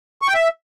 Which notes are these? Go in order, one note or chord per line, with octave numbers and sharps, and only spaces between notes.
C#6
G5
E5